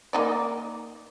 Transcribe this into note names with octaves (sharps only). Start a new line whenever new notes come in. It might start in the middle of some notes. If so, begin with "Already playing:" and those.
A#3 D#4 D5